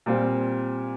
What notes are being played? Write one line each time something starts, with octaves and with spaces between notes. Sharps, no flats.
A#2 G3 C4 F4